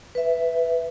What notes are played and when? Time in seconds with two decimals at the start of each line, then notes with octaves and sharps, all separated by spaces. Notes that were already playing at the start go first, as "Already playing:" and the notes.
0.15 B4 E5